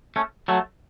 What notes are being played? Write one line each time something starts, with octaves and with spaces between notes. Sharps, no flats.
A3 C#4
F#3 A3